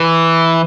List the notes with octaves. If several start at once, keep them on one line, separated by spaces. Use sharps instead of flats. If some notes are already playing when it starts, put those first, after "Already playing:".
Already playing: E3